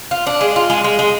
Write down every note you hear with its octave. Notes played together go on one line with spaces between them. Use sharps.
F4
D4
G#3
F4
G#3
G#3
G#3